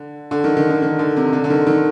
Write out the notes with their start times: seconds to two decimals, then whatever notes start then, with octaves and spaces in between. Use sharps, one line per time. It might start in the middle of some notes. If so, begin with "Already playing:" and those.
Already playing: D3
0.31 D3
0.44 D#3
0.57 D#3
0.69 D3
0.82 D#3
0.99 D3
1.16 C3
1.33 D3
1.44 D3
1.50 D#3
1.67 D#3